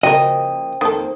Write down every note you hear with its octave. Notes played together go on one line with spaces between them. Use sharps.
C#3 F3 A#3 F#4 A#4 D#5 G5
F2 D#3 A#3 C4 A4